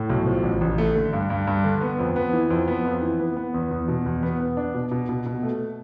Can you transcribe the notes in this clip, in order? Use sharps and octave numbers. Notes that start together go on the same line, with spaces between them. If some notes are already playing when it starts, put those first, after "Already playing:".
Already playing: A2
B1
F3
A1
A1
A3
D3
G2
G2
G2
D3
B3
F2
B3
E3
F2
B3
F2
E3
B3
B3
E2
E2
B2
E2
B3
B3
D4
B2
B2
B2
B2
A3